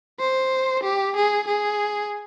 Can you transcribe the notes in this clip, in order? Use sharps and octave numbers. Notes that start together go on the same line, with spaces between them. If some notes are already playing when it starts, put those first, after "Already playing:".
C5
G4
G#4
G#4